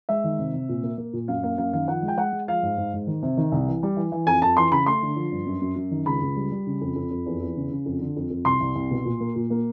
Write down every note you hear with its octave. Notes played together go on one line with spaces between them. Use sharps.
G#3 E5
D#3
C3
C3
A#2
A#3
A#3
A#2
F#2 F5
A#3 F5
F#2 F5
D#3 F5
F3 F#5
G#3
G5
G#3 F#5
G#3
F3 F5
G#2
G#2
G#2
D#3
C3
D#3
C2
E3
G3
E3
E3
F2 G#5
F2 A5
E3 C6
C#3 B5
A3 C6
D3
F3
G2
F#2
F#2
F#2
D#3
C#2 B5
C#2
G3
G3
C#3
F2
F2
F2
E2
E2
C#3
C#3
F2
D3
F2
F2
C2 C6
C2
C2
B2
A#2
A#3
A#2
A#3